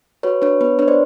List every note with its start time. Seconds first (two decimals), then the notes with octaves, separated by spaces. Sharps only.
0.23 F#4 B4 C#5
0.42 D4 B4 C#5
0.61 B3 B4
0.79 D4 B4 C#5
0.88 C5 D5